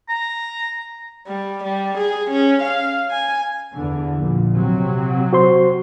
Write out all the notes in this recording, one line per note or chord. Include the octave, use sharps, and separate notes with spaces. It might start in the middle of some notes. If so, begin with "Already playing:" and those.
A#5
G3
G3
G#4
C#4
F5
G#5
E2 D3
A#1 A#2
C3 F#3
F#4 C5 C6